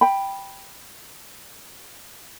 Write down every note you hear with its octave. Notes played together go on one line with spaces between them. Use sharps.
G5 B5